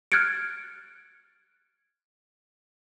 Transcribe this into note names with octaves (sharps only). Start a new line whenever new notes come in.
F6 F#6 G#6 A6 C#7 D7